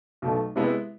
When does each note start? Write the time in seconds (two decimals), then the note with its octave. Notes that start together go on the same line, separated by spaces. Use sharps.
0.22 B1 B2 A3
0.56 C3 G#3 B3 E4 B4